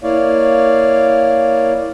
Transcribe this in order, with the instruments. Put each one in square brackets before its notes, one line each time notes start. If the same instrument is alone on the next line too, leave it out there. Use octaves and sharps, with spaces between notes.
[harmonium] A#3 E4 C#5 D5 F5